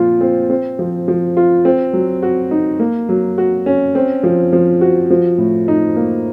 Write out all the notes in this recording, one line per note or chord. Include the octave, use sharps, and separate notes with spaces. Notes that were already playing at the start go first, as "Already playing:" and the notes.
Already playing: A#2 F3 F4
C4
C4
F3
F3
F4
C4
F#3
F#4
D#4
A#3
F#3
F#4
C#4
C4
F3
F3
F#4
F3
A2
D#4
A#3